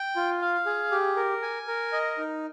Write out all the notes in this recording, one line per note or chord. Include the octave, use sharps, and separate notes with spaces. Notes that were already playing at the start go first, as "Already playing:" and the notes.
Already playing: G5
F4
F5
G#4
G4
A#4
G#5
A#4
D#5
D#4